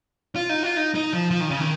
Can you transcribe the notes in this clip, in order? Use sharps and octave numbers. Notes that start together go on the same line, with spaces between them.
F4
D#4
F4
D#4
D#4
F3
F3
D#3
C#3
D#3